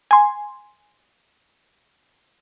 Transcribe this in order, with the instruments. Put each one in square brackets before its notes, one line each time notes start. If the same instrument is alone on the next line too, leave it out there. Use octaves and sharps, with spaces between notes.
[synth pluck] G#5 C6